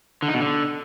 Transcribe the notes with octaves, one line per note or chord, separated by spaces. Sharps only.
D3
D#4
B2
D3